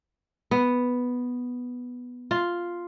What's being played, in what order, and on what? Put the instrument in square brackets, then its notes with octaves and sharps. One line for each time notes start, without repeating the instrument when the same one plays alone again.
[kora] B3
F4